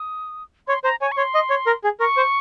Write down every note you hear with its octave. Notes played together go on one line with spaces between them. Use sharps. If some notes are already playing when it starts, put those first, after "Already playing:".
Already playing: D#6
C#5 C6
C5 A#5
C#5 G#5
C#6
C#5 C6
D#5
C#5
A#4
G#4
A#4 C#6
C5